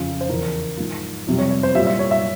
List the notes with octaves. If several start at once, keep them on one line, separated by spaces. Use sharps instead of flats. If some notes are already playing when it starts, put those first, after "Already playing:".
Already playing: F2 C#3 F3
C5
E2 C#3 F3 A#4
G#2 F3
F2 C3 G3
C#5
C#5
C5
A#2 G3 E5
E5
C#5
E5